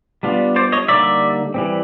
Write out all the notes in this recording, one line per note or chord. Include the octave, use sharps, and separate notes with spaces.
G3 B3 D4 F4
C5 D5
C#5 D#5
D3 G3 A#3 D#4 D5 E5
E3 G3 C4